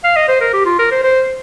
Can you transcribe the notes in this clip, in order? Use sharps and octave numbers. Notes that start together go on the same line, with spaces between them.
F5
D#5
C5
A#4
G4
F4
A#4
C5
C5